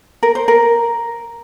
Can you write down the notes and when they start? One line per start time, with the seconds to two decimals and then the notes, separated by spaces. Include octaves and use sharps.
0.23 A#4
0.35 C5
0.48 A#4